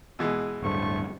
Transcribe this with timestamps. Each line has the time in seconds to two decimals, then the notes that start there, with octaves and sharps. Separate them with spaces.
0.19 B2 E3 G#3
0.62 D1 G2 A3 C5 C#6